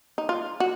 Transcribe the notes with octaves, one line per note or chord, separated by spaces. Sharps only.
D#4
F4
F#4